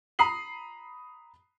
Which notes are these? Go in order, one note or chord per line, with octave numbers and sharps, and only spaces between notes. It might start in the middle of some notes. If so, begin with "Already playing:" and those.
A#5 B5 D#6 C7 F#7